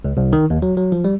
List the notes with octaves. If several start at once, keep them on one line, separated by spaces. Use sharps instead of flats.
C#2
C2
D#3
D#2
F#3
F#3
F3
G3